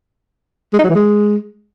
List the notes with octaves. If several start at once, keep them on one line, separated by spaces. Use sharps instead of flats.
G#3
D#4
F#3
E3
G#3